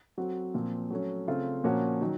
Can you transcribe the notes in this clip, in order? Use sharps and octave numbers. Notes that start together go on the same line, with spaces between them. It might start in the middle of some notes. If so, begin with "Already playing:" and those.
F#3 C4 F#4 A4
A#2 F3 C4
F#3 A3 C#4
C#3 A3 C4 F4
A#2 F3 A#3 C#4 F#4
D#3 F#3